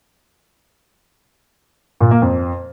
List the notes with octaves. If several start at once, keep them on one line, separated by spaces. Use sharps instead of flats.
A#2
A#3
F2